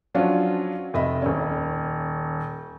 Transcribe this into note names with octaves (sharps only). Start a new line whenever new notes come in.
F3 F#3 C#4 D4 F4
F1 D#5 E5 B5
D#1 C#4